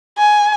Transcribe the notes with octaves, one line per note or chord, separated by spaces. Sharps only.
G#5